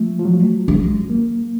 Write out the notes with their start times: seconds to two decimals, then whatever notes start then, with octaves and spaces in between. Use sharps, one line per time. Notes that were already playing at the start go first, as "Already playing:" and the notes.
Already playing: F3 A3
0.19 F3
0.25 F#3
0.68 G#3
1.10 A#3